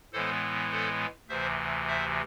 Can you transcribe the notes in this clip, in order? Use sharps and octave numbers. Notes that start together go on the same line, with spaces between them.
A2 E3 G#3 B3 A4 C5
A4 C5
D2 C3 E3 C5 E5
C5 E5